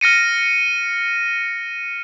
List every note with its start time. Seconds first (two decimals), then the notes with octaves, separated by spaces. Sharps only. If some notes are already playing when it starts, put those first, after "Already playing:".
0.01 F6 A#6 C#7 D#7